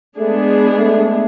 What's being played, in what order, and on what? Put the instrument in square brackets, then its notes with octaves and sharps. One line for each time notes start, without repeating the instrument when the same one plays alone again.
[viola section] G#3 B3 D4 G#4 [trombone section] A3
[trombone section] A3